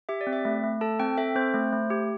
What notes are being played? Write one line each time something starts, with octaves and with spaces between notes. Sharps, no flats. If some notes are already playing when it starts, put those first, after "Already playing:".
G4 E5
D5
C4
E5
A3
A3
A4 A5
C4 G5
A4 E5
C4 C5
A3
A3
G4